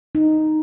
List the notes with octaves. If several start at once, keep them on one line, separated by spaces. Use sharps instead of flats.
D#4